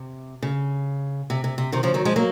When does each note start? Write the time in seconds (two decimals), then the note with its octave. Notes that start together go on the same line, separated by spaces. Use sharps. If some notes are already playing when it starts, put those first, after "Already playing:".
Already playing: C3
0.42 C#3
1.30 C3
1.44 C3
1.58 C3
1.72 C3 D#3
1.83 C#3 F3
1.94 D#3 F#3
2.05 F3 G#3
2.16 F#3 A#3